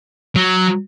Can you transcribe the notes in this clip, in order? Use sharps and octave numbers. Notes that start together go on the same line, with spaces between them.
F#3